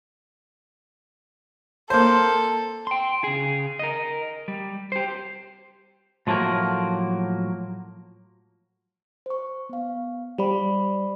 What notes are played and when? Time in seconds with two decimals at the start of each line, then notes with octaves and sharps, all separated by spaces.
1.90 A#3 A4 C5
2.87 G5 C6
3.24 C#3 G#4
3.79 A#4 D#5
4.48 G3
4.92 G4 C5
6.27 A2 F3 F#3 A3 A#3
9.26 C5 C#6
9.69 B3 F5
10.38 G3 C5 D5 B5